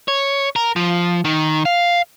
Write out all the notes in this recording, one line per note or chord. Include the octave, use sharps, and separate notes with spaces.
C#5
A#4
F3
D#3
F5